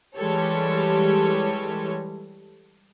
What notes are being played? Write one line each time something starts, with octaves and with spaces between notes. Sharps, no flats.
E3 G3 G#3 G4 A4 C#5